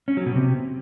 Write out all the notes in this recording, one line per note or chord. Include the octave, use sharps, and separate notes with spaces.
C#4
F#3
B2
C3